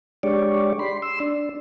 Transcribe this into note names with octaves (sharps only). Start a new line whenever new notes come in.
G#3 D4 G4 C#5 D5
B5 C6
C6 E6
D4